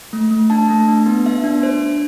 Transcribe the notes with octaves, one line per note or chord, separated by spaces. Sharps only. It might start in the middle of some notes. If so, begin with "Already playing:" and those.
A3
A3
D4 A5
A3
D4
B3
B3 E5
D4
D4 C5
D4